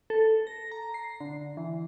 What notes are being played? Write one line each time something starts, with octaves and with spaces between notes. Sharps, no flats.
A4
A#6
A#5
C7
D3
E3